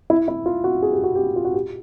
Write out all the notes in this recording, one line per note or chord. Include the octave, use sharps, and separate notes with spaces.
E4
E4
F4
F#4
G#4
G4
F#4
G4
F4
F#4
G4